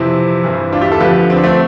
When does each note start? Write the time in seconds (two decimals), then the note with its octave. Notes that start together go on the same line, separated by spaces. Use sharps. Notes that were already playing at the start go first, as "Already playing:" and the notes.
Already playing: F2 C3 E3 C4 E4
0.44 G2 E3
0.72 D4 F4
0.81 E4 G4
0.92 F4 A4
1.00 F2 D3 F3 G4 B4
1.30 C4
1.37 D4
1.44 A3 C4